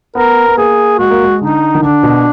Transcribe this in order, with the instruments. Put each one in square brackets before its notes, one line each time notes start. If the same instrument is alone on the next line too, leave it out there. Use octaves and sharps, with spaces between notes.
[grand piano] B3 [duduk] A#4
[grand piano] B3
[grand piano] A#3 [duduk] G#4
[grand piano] G#3 [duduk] F#4
[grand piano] A#3
G#3
[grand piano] D3 [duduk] D#4
[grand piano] D#3
[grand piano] D3 [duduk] D4
[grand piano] B2